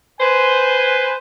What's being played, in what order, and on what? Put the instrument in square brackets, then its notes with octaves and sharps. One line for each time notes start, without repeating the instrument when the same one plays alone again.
[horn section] B4 C5 G#5